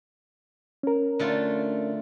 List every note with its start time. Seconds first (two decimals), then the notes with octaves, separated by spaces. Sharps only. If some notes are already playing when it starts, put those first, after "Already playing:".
0.83 C#4 A#4
1.19 D3 A3 F4